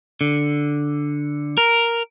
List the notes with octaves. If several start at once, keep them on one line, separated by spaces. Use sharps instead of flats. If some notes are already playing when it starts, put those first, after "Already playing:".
D3
A#4